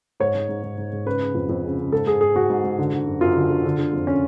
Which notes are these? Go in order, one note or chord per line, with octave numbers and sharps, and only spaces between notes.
G#2 C#5
G#2
G#2
G#2
G#2
G#2
C#3 B4
C#3
F2
F2
C#3
C#3
G#2 A4
G#2 G#4
G#2 G#4
G#2 F#4
G#2
G#2
D3
D3
F#2
F#2 F4
D3
D3
D3
D3
F2
C#4